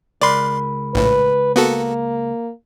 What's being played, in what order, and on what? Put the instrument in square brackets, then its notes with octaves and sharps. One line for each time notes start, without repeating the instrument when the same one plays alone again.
[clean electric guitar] C#2 A#4 B5 [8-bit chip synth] D5 C6
[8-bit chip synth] A#1 A2 [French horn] B4
[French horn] A#3 [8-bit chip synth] B3 F#4 A4